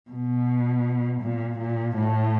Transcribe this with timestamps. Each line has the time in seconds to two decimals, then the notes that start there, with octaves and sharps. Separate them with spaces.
0.11 B2
1.22 A#2
1.59 A#2
1.96 A2